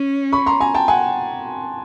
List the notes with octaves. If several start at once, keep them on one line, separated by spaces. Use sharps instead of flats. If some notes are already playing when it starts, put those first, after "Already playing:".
Already playing: C#4
B5 C#6
A#5 C6
G#5 A#5
G5 A5
F#5 G#5